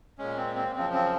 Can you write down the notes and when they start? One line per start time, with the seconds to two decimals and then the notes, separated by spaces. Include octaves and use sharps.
0.18 A#2 G#3 C#4
0.37 C4
0.56 C4
0.74 F#2 C#3 F3 C4
0.93 C4